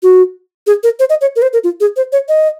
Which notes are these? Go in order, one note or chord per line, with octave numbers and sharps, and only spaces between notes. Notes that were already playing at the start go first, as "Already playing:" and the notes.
F#4
G#4
A#4
C5
D#5
C#5
A#4
C5
A#4
F4
G#4
C5
C#5
D#5